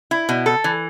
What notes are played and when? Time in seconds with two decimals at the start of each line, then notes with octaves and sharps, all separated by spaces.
0.11 E4
0.29 B2
0.46 A4
0.64 E3